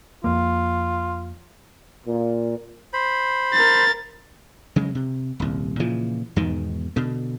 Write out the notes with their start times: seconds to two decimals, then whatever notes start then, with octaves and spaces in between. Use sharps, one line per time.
0.24 F2 A#3 F4
2.06 A#2
2.93 C5 B5
3.53 A#4 A6
4.76 C#3 F#3 G#3
4.95 C3
5.40 D#1 C2
5.80 A#2 C#3 E3 F3
6.36 E2 G#2 B2 D#3
6.96 B2 D3